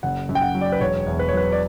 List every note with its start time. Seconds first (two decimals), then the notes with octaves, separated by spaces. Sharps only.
0.03 F#1 F#5
0.29 F#2
0.35 G5
0.42 F#5
0.55 F#3
0.61 D5
0.72 B4
0.81 E1 C#5
1.07 E2
1.19 B4
1.28 C#5
1.33 F#3 B4
1.52 D5